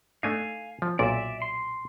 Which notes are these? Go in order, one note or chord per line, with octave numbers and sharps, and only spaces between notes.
A3 D4 D#4 F5 G#5
F3
B1 A#2 D5 E5
C6